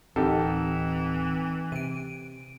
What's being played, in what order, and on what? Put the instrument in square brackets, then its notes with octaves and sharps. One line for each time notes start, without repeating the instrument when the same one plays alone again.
[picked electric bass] D1 [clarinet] E3 [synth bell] C4 [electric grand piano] D#4 G4 A4
[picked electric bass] C3 [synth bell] D7 D#7